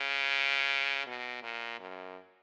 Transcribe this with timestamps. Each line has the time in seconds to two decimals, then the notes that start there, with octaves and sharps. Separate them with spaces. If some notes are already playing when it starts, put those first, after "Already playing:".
Already playing: C#3
1.07 B2
1.43 A#2
1.79 F#2